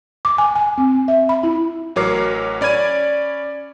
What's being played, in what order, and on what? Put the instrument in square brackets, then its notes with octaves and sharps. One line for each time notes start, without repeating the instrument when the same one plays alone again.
[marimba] D6
G#5
G#5
C4
E5
B5
E4
[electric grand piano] A1 F#3 A#4 C#5 D6 C7
C#4 D5 B5 G#6 D#7